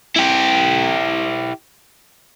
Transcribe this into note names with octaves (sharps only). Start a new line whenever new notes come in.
E4 G4